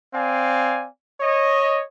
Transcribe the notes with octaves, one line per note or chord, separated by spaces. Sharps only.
C4 D5 F5 G#5
C#5 D#5